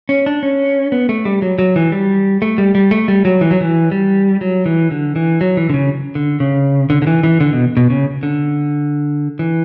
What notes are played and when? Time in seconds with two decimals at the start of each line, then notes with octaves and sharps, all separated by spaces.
0.09 C#4
0.26 D4
0.43 C#4
0.92 B3
1.09 A3
1.25 G3
1.42 F#3
1.59 F#3
1.76 E3
1.92 G3
2.42 A3
2.58 G3
2.75 G3
2.91 A3
3.08 G3
3.25 F#3
3.41 E3
3.51 F#3
3.61 E3
3.91 G3
4.41 F#3
4.66 E3
4.91 D3
5.16 E3
5.41 F#3
5.57 E3
5.70 D3
5.74 C#3
6.15 D3
6.40 C#3
6.90 D3
7.02 D3
7.07 E3
7.23 E3
7.41 D3
7.53 B2
7.77 B2
7.90 C#3
8.23 D3
9.39 E3